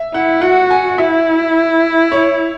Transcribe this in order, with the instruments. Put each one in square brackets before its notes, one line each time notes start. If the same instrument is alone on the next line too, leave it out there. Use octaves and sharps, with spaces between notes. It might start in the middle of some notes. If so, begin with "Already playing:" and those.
Already playing: [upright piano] E5
[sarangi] E4 [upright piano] F#5
[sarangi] F#4 [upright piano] F#5
[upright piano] G#5
[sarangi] E4 [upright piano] E5
[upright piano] C#5